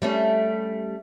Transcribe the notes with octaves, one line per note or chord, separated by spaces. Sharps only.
G3 A3 C#4